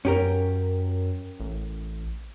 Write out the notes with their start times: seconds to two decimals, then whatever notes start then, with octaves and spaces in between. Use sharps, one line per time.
0.05 F#2 C#4 G4 A#4
1.40 A1